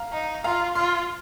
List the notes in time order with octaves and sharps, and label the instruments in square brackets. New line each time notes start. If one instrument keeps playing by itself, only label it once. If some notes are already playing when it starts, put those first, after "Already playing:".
Already playing: [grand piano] F5 A#5
[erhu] D#4
[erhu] F4 [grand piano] F5 A#5
[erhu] F4 [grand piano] C6 F6